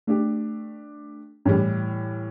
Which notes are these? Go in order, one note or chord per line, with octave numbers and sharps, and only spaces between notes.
A3 D4 G4
A2 E3 G3